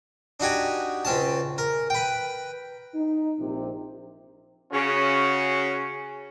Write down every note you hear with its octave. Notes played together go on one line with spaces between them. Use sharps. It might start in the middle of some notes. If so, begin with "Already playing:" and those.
D4 D#4 F#4 G4 G#5
C#2 C4 C#4 A5
A#4
B4 G5
D#4
A#1 C3
C#3 C#4 F#4